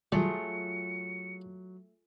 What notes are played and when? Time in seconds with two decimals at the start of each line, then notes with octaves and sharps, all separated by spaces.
0.12 F#3 G3 A3 F4 G#4 C#7